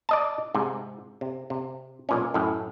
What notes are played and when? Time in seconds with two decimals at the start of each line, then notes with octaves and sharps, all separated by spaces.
0.09 D5 D#5 A5
0.55 G#2 C3
1.21 C3
1.50 C3
2.09 B1 A#2 C#4
2.34 F#2 A2